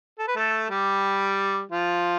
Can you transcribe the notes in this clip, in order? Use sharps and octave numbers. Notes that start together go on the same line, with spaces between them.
A4
B4
A3 A4
G3 G4
F3 F4